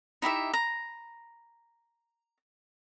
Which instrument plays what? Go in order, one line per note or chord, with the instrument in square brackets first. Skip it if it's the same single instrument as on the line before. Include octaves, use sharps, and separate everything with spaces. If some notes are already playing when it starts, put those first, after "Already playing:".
[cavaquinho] D#4 E4 G4 E5
A#5